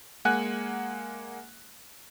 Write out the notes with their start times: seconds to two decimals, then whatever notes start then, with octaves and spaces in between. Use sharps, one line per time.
0.25 G#3 A#3 F#5 G#5 F#6